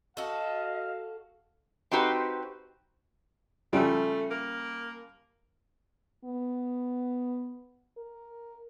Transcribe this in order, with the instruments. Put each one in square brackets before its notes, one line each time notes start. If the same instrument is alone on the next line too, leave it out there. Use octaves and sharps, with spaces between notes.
[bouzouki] F#4 A4 [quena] D#5 [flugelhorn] F5
[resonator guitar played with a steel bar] C4 D#4 F#4 G4 B4 C5
[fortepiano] C#3 F3 G3 [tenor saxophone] A3
[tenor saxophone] A#3
[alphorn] B3
A#4